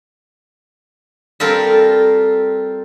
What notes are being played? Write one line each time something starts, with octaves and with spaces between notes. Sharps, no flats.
G3 C4 F4 A4 A#4